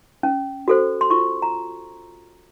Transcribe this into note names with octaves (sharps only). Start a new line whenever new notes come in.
C#4
F#4 A4 C5
C6
F4 C#6
A#5